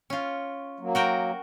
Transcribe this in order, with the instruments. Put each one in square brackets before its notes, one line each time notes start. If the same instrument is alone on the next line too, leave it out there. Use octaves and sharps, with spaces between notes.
[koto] C#4 F4
[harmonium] F#3 A#3
[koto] F#4 A#4 G5